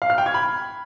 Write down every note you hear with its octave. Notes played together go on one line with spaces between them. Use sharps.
F5
F6
G5
G#6
B5